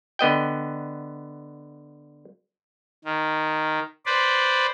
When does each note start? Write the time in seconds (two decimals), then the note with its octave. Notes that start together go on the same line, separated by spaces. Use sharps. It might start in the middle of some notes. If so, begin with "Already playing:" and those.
0.19 D3 B3 D#5 G5
3.05 D#3
4.06 B4 C5 D5